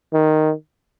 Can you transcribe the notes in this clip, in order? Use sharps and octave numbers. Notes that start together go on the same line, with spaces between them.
D#3